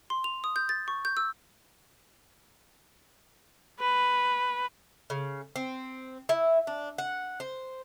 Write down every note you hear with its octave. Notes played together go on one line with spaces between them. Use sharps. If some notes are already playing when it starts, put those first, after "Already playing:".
C6
F7
D#6
G6
A6
C#6
G6
E6
B4
C#3
C4
E4
D4
F#5
C5